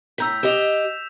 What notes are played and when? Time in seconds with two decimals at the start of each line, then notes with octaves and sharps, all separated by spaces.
0.18 A2 A#5 E6 G6 B6
0.43 G4 D#5 E7 F7